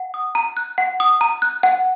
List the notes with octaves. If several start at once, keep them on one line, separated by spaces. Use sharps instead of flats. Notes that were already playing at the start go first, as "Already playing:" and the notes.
Already playing: F#5
D#6
A#5
F#6
F#5
D#6
A#5
F#6
F#5